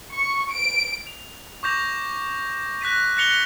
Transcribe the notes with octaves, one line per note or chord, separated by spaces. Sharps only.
C#6
D7
F7
C#6 D6 G6 A#6 F7
F#6 A#6 B6 D#7
F#6 A6 A#6 C#7 F7 G7